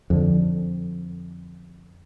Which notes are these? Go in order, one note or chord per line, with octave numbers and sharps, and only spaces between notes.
F2 D3